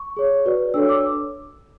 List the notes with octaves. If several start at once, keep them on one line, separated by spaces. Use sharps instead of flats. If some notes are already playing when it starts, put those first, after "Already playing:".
Already playing: C#6
G#4 C#5
F#4 B4 D5
D4 A4 C#5 E6
D6